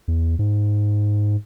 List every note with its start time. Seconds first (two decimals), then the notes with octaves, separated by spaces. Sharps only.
0.08 E2
0.39 G#2